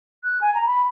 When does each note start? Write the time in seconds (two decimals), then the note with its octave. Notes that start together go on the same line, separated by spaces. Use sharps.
0.24 F#6
0.41 G#5
0.55 A#5
0.66 B5